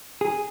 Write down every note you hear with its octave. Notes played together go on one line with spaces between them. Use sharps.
G#4